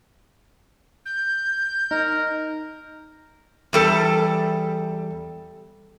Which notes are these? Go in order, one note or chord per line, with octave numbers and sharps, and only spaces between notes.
G6
D#4 A#4
E2 G3 A4